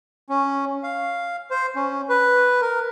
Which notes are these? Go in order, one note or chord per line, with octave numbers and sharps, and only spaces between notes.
C#4
F5
C5
C#4
B4
A#4